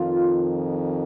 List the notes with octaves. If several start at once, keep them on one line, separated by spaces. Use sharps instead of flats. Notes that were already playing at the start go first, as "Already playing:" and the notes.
Already playing: F2 D#3 F4